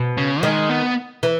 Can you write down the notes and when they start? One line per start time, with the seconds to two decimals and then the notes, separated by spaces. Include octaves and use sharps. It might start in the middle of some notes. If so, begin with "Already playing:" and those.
Already playing: B2
0.18 C#3
0.43 D#3 G#3
0.70 B3
1.23 E3